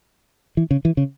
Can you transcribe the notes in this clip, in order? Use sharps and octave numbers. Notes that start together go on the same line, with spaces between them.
E3
C#3
E3
C#3